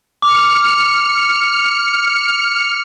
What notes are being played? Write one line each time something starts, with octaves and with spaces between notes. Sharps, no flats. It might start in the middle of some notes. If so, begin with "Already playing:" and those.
D6 F6 C#7